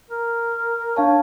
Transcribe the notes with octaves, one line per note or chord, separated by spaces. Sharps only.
A#4
D4 C#5 F5 A5